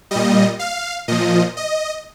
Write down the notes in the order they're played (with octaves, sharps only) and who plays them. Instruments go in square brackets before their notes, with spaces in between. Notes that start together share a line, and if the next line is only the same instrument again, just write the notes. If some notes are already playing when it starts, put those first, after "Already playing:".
[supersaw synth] A#2 G3 D#5
F5
A#2 F3 D#5
D#5